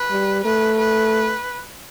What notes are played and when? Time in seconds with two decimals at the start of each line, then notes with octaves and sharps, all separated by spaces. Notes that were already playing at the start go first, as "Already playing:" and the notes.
Already playing: B4
0.11 G3
0.44 A3 B4
0.79 B4